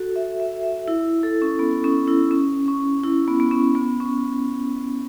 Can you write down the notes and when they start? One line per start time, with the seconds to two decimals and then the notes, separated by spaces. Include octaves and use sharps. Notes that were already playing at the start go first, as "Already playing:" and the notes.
Already playing: F#4 A4
0.16 E5
0.40 E5
0.63 E5
0.88 E4
1.23 A4
1.42 C#4
1.59 B3
1.84 C#4
2.08 E4
2.31 C#4
2.68 C#4
3.04 E4
3.28 B3
3.40 B3
3.51 C#4
3.75 B3
4.00 C#4